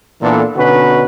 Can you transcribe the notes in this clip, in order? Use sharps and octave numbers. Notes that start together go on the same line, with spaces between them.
A#2 E3 B3 D4 A4
B2 D3 C#4 D#4 F#4 B4